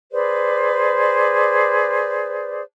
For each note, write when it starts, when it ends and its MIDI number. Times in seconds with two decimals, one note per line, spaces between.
0.12 2.62 68
0.12 2.62 71
0.12 2.62 72
0.12 2.62 74